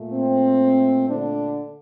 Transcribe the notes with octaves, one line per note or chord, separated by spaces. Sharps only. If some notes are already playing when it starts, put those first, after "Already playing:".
Already playing: A#2 A3
C4
D3 D4